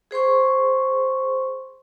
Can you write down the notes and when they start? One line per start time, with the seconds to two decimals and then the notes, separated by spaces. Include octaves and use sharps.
0.11 G#4 C5 C6 C#6